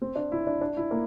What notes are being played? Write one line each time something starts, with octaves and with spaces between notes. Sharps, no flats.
C4
D4
E4
D4
D4
E4
A#3